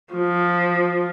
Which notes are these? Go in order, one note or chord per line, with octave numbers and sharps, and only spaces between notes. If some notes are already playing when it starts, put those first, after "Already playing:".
F3